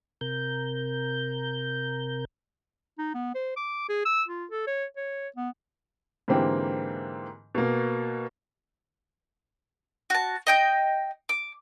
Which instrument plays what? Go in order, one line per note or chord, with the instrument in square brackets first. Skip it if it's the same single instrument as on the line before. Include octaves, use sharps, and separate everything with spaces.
[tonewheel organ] C3 A#4 G6
[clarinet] D#4
B3
C5
D6
G#4
E6
F4
A4
C#5
C#5
B3
[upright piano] G#2 D3 E3 A#3 C4 G4
B2 A#3
[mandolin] F#4 A5
D#5 G5 G6
D6